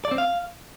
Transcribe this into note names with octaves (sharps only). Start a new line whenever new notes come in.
D5
C4
F5